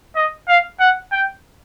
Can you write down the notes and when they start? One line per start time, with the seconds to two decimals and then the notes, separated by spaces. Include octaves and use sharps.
0.16 D#5
0.48 F5
0.80 F#5
1.12 G5